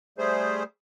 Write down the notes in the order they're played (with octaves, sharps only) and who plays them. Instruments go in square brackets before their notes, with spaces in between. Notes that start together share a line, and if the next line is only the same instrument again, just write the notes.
[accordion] G3 A3 G#4 C5